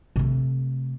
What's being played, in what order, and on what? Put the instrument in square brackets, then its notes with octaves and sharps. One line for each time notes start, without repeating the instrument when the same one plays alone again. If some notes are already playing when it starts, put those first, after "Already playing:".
[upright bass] C3 A3